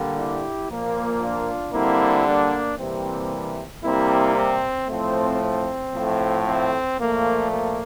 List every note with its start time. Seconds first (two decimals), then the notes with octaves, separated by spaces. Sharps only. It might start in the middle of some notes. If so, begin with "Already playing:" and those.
Already playing: D3 G3 A#3
0.17 E4 G4
0.69 A#2 F3 A#3
1.22 D4 F4
1.73 D3 G3 A#3 C4 E4
2.26 A#3 D4
2.79 C3 E3 G3 A#3 C4
3.83 C3 G3 A#3 C4 E4
4.36 C4
4.88 A2 F3 A3 C4
5.41 C4
5.94 A2 F3 A3
6.45 C4
6.98 A#2 F3 A3 A#3
7.51 A#3